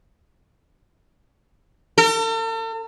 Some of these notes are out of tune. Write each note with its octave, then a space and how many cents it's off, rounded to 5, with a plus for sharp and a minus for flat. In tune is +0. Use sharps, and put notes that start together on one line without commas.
A4 +45